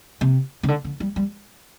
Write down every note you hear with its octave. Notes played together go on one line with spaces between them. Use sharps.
C3
C#3
D3
D3
G3
G3